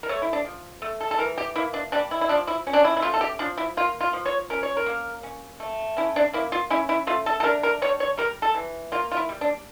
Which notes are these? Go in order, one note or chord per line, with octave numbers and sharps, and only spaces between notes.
A#4
A3 C#5
E4
D4
F3
A3
A4
A4
E3 A#4
G4
A#3 E4
D4
G3 D4
E4
E4
F3 D4
E4
C#4
D4
E4
E4
A3 F4
A4
G4
F3 D4
E4
A#3 F4
F4
F3
C#5
C#4 A#4
C#5
A#4
A#3
C#4
A3
C#4 E4
D4
A#3 E4
F4
C#4 E4
E4
A3 F4
A4
A4
D4 A#4
A#4
G3 C#5
C#5
G3 A#4
A4
E3
A#3 F4
F4
E4
G3
D4